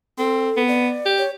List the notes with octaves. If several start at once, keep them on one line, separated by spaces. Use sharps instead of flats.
C4 A4
B3
D5
G4
C#5